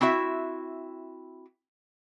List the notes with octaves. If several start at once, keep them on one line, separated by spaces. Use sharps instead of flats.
C4 E4 F#4 E5